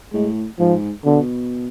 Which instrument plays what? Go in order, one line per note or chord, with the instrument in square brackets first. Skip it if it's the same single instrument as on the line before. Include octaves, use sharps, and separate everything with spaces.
[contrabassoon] A2 [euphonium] G#3
[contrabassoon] G#2 [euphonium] F3
[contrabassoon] B2 [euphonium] D3